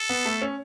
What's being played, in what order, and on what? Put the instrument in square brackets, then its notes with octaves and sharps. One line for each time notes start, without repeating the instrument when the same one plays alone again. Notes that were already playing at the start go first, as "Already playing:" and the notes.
Already playing: [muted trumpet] A4
[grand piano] B3
A3
C#4